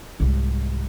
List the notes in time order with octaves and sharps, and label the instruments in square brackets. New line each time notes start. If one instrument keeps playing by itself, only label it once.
[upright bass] C2 G#2